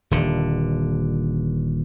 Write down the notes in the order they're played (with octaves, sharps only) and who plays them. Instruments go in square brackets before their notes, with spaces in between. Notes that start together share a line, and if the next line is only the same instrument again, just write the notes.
[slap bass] D#1 D3